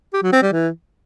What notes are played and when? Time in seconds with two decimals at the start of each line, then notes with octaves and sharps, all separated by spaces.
0.13 G4
0.23 F#3
0.33 C4
0.42 G3
0.52 E3